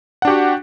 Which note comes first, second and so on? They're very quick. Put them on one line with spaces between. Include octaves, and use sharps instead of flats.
F#5 D4 G4 F#4